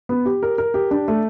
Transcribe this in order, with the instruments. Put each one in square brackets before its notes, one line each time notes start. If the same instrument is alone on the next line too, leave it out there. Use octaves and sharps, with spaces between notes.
[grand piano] B3
G4
A#4
A#4
G4
D4
A3